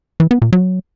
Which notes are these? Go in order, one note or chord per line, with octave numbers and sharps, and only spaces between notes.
E3
B3
A#2
F#3